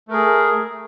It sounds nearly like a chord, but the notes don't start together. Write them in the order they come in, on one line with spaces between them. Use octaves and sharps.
A3 A#4 G#4